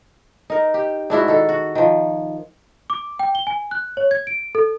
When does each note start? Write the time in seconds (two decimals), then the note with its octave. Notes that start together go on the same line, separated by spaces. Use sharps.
0.50 D#4 A#4
0.74 G4
1.10 G#2 D4 E4 F#4
1.28 D#3 A4
1.49 F#4
1.75 D#3 F3
2.90 D6
3.19 G5
3.35 G7
3.47 G#5
3.71 F#6
3.97 C#5
4.11 G#6
4.27 D7
4.55 A4